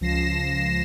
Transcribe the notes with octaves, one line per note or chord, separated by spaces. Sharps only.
C#2 F3 A#6 C7 E7